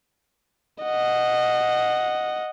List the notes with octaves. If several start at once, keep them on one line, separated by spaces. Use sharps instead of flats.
D#5 F#5